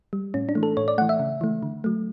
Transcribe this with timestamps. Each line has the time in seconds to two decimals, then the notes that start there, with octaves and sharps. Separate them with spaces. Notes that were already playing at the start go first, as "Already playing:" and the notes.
0.13 G3
0.34 A2 C#4
0.49 D4
0.55 E3 A3
0.63 A4
0.77 A2 C#5
0.88 D5
0.98 E3 A3 F#5
1.09 E5
1.20 C#3
1.41 E3 A3
1.63 D3
1.84 F#3 A3